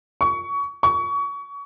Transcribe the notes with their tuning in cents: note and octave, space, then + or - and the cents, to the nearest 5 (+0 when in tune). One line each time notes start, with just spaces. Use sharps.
C#6 +25
C#6 +30